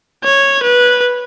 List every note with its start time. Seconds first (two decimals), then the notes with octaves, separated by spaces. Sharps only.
0.25 C#5
0.63 B4